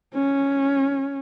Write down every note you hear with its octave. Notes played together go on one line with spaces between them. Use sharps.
C#4